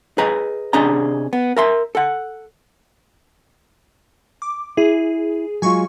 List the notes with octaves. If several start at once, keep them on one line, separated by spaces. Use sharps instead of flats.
G#4 B4 D#5 A#5
C3 C#4 D4 G#4 D#5 A#5
B3
A#4 E5 C6
A4 F#5
D6
E4 G#4
F#3 G#3 F4 G#5 C#6